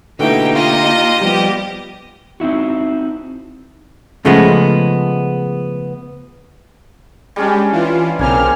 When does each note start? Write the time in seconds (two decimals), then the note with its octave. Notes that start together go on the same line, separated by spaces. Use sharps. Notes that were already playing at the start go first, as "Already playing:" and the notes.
0.19 B2 D3 A3 A#3 D#4 E4 G4 G5
0.55 F4 D#5
1.21 F3 G3 B3 G4
2.40 C4 D#4 E4 F#4
4.25 C#3 F3 G#3 A3 B3
7.36 G3 G#3 C#4 D4 G4
7.72 E3 F4
8.19 B1 C#3 A#3 C4 G#5 C6 F6